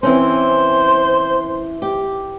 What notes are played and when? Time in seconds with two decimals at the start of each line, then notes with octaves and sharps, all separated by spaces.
0.03 E3 C4 C#4 C5
1.82 G4